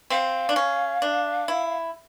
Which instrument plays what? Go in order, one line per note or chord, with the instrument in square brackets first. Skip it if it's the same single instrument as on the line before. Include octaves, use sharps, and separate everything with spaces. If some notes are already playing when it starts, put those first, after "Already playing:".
[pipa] C4 [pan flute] F5
[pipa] D4
C#4
D4
E4